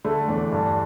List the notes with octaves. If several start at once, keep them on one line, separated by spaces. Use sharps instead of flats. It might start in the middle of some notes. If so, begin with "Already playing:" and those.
D3 A3
E2 D4
G2